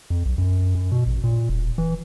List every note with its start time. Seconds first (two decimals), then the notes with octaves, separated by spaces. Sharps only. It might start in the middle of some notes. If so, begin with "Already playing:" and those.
0.10 F2
0.26 B1
0.38 F#2
0.75 F#2
0.92 B2
1.06 A1
1.24 A#2
1.49 E1
1.78 E3